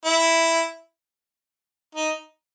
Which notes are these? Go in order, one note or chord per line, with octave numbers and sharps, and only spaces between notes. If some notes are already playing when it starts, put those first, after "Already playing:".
E4
D#4